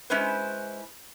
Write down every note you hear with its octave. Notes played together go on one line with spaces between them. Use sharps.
G#3 C#4 E4 B4 C5